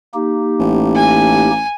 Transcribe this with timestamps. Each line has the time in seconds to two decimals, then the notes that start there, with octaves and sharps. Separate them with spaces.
0.14 A#3 D#4 G4
0.59 A1
0.95 G#5